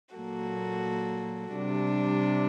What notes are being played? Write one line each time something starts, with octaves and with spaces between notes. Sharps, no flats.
A#2 F#3 A#3 F#4 A4
C3 G3 D4